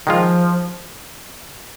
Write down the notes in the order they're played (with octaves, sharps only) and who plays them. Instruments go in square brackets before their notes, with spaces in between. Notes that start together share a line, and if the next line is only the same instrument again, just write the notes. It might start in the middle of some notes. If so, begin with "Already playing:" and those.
[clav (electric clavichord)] D#3 G#3 F4 [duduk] F3